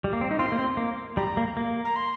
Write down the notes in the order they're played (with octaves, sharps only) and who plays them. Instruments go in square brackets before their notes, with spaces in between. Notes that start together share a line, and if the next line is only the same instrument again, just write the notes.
[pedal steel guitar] G3
A#3
C4
D#4
[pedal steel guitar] C4 F4 [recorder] C6
[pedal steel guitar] A#3
C4
A#3
[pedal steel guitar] G3 [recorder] A#5
[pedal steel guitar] A#3
A#3
[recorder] A#5
C6